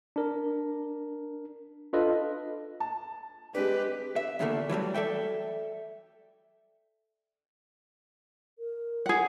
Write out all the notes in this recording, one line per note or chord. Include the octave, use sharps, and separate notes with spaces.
D4 A#4
D4 F4 A4 B4 D#5
A5
G#3 C4 D4 G4 B4
E5
E2 A#2 D3 E3 A3 A#3
E3 F#3 G3 A3
A4 D5 E5 G5
A#4
G#4 F#5